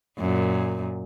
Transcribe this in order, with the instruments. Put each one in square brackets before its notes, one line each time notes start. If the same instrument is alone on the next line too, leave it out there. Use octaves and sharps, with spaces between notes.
[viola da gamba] F#2 A#2